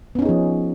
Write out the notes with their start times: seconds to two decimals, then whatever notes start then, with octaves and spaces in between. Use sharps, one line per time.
0.15 B3
0.19 C#4
0.22 D#4
0.25 G#4
0.29 F3